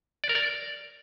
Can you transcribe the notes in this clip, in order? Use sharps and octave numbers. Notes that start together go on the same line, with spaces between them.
D5
A#4
D5